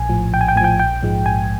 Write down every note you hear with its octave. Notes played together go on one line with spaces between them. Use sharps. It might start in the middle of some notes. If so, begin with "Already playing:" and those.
Already playing: A#1 G#5
A2 F3
A#1 G5
G#5
G5
A2 F3 G5 G#5
A#1 G5
G#2 F3 G#3
A#1 G#5